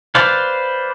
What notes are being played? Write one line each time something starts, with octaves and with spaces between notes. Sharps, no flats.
B4 C5 D5 F5